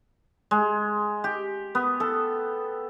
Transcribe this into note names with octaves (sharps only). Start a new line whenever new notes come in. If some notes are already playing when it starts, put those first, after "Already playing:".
G#3
G4
B3
A4